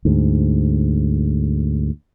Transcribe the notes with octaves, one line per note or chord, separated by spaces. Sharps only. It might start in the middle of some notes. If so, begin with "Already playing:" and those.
D2 G#2